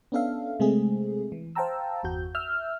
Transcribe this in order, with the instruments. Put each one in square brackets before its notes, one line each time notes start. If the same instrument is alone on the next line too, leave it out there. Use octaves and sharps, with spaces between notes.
[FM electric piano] B3 C#4 D4 A4 E5 F5
C3 G#3 A3 C4 G#4
E3
C5 F5 G5 A5 A#5 E6
G1 E2 F#4 G6
E5 E6 F6 G6